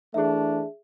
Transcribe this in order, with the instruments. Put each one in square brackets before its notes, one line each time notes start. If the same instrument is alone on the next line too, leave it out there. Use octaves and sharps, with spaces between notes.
[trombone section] E3 A3 D4 [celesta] G#4 E5